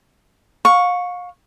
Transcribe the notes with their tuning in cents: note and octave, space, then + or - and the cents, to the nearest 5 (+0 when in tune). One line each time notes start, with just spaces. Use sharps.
F5 +35 C#6 +0